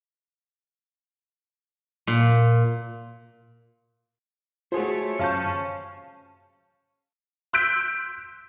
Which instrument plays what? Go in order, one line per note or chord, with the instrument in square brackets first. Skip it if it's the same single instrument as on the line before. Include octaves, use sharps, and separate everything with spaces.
[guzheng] A#2
[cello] A3 C#5 [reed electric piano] F4 [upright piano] F#4 G#4 C5
[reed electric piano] F#2 G6 [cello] C#4 [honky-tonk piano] F5 A5 C#6
[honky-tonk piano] C6 E6 F#6 G6 B6 D7